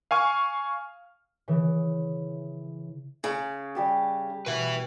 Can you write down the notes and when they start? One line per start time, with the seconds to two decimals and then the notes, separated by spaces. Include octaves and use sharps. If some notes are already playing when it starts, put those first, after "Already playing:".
0.11 F5 G#5 C#6 F6
1.48 C#3 E3
3.24 C#3 G#4 E6
3.75 G3 G4 A5
4.46 B2 B4 E5